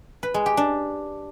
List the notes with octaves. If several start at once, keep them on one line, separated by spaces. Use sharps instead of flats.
B4
G#3
G4
D4